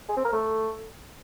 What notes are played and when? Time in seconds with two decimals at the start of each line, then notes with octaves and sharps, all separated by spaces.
0.09 G#4
0.17 C4
0.25 A#4
0.33 A3